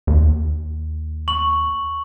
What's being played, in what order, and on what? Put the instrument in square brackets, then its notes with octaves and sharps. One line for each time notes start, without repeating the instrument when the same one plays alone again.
[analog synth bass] D#2
[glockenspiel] C#6 F#7